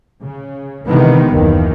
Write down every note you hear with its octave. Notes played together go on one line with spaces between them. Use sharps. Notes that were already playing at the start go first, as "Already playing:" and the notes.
C#3
C3 D#3 E3 G#3 B3
F#1 D#2 D#3 E3